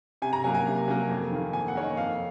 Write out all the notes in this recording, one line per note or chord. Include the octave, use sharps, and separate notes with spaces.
C3 G#5
A#5
F#3 A#3 G#5
G#5
C3
F#3 A#3
F2
D#3 A#3
F2 G#5
F#5
D#3 A#3 C#5
D#5
F2 F5